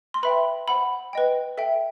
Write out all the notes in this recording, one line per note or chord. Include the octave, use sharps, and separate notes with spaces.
C6
B4 E5 G5 B5
C5 F#5 B5
B4 D#5 G5
A4 E5 G5